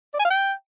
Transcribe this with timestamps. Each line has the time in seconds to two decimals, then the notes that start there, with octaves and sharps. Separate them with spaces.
0.14 D5
0.20 G#5
0.25 F5
0.30 G5